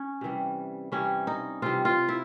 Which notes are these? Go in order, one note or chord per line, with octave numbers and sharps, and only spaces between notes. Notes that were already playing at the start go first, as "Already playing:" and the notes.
Already playing: C#4
C3 E3 G3
C3 E3 G3 C#4
D#4
C3 E3 G3 F4
F4
E4